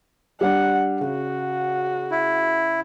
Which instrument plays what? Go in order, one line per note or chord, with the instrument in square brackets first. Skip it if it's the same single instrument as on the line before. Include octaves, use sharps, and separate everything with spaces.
[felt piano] G3 D4 [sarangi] F#5
[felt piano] C#3 [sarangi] F#4
[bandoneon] E4